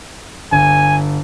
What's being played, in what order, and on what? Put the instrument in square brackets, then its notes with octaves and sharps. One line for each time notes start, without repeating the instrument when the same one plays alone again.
[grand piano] G1 [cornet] G#5